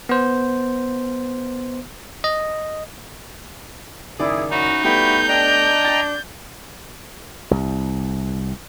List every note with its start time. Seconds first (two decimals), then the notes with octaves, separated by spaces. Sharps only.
0.09 B3 C5
2.24 D#5
4.20 F#1 D#3 E4 G#4 D5
4.51 C#4 D#4 E4 F#4
4.84 G3 A3 B3 E4 F#4 G4 G6
5.28 D4 D#5 G5 A#5
5.85 A6
7.51 C2